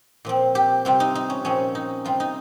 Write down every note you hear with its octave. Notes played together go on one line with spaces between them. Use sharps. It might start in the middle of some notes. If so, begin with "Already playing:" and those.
A#2 F3 C4
G4
C3 G3 C4 F4
D#4
D#4
C#4
A#2 F3 C4 C#4
D#4
C3 G3 C4 F4
D#4